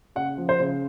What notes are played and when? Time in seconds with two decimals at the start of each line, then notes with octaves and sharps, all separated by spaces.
0.16 C#3 F#5
0.38 F3
0.49 C5
0.60 C#3